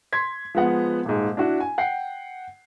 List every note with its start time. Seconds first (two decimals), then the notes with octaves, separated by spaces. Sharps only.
0.13 C6 G#6 B6
0.55 F3 G#3 B3 F#5
1.05 D#1 G#2
1.37 D4 E4 F#4
1.60 G#5
1.78 F#5 G5 C7